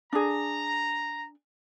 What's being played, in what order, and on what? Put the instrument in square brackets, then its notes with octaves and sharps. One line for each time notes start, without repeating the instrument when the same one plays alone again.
[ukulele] D4 G#4 [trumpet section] A#5